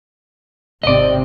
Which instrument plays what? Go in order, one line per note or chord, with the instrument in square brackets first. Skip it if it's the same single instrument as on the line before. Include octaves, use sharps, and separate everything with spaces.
[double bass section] G#1 C3 C4 [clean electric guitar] D5 D#5